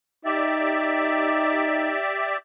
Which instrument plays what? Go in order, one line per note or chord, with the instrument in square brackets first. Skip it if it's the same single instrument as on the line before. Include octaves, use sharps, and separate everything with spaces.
[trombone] D#4 [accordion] G4 D5 E5